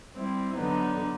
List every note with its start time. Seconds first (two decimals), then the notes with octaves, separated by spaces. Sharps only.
0.13 G3 C4 E4
0.56 D3 F#3 B3 D#4